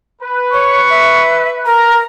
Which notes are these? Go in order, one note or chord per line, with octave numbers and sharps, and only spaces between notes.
B4
C#5 C#6
E5
A#4 A#5